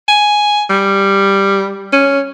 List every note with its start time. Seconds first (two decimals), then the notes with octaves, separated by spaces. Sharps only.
0.08 G#5
0.70 G3
1.93 C#4